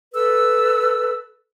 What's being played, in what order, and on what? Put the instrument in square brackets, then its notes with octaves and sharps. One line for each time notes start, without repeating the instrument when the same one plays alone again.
[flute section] A4 B4 E6